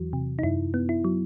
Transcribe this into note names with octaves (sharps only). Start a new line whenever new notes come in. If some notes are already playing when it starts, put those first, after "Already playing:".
Already playing: E2 E3 F#3 F#4
C3
D#4
F#2 E4
B3
E4
F#3